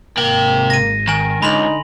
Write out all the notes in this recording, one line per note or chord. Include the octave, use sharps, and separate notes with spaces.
G#1 C3 A#3 G5
A#6 D#7
D#3 G#5 A#5
C#2 D3 D#4 B5 C6 F#7